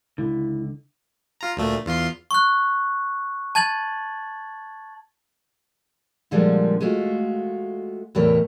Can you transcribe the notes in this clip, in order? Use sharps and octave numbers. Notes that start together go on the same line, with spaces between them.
C#2 D3 E4
F4 A#5
D2 A#2 A3
E2 F4 C6
C#6 F#6
A5 G#6 A6 F#7
A#2 D3 F3 G3 G#3 A#3
G#3 A3 F4 F#4
E2 A2 C3 A3 A#4 C#5